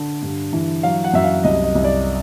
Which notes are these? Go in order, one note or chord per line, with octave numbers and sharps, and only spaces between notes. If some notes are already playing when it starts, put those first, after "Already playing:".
Already playing: D3
G2
E3
F#3 F5
F#5
F#2 E5
F5
C2 D#5
D#5
C2
D5